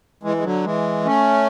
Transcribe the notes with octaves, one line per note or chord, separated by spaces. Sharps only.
E3 G#3
G#3
D3 F#3
E3 G#3
A3 C#4